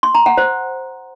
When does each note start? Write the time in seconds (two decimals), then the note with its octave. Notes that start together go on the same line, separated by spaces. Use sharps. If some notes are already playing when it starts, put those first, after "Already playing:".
0.03 C6
0.15 A#5
0.26 F#5
0.37 C5